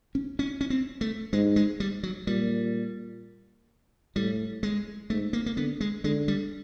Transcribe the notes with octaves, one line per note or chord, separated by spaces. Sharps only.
C#4
C#4
C#4
C4
A3
G#2 G#3
G#3
G3
F#3
A#2 G3
A2 G3
G#3
G#2 A3
A#3
A#3
D3 B3
G#3
D3 G#3
G3